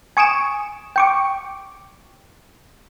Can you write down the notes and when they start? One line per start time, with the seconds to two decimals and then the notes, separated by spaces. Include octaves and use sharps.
0.17 G#5 C#6 D#6 D7 E7
0.96 G5 C#6 D6